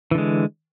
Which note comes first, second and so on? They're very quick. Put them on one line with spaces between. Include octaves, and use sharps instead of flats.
E3 D3 G#3